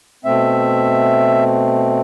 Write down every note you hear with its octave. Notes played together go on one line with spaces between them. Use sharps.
B2 A3 C4 E5